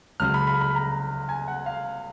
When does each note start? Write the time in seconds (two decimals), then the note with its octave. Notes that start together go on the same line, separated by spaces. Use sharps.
0.20 C#2 C#3 F#3 F6
0.34 B5
0.47 B5
0.61 B5
0.75 A#5
1.29 G#5
1.48 F#5
1.66 F5